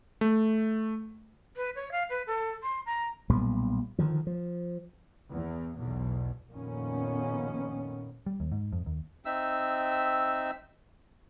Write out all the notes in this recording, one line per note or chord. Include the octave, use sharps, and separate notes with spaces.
A3
B4
C#5
F5
B4
A4
C6
A#5
B1 A#2 G3 B3
D3 D#3 F3
F3
E2
B1 E2 B2
F2 A#2 D#3 B3 C#4
G3
D#2
G#2
F2
D#2
C4 D#4 E5 E6